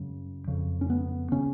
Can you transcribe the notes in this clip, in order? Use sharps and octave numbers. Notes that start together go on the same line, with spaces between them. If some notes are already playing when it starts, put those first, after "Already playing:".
Already playing: F#2 C#3
F2 C#3
C#4
B3
C#3 C#4